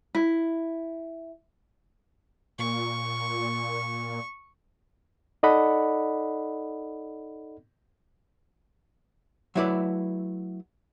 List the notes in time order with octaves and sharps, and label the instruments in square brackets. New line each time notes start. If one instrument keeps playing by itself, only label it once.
[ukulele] E4
[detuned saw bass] A#2 [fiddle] C#6
[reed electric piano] D#4 A4 D5 D#5 F#5 B5
[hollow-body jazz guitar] F#3 A3 E4 B4 D5 E5